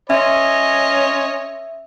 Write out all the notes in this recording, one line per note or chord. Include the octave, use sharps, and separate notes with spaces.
C#4 C#5 D#5 E5 C6